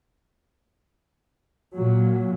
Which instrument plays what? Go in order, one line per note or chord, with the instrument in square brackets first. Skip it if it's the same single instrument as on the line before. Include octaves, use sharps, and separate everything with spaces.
[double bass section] A#2 F#3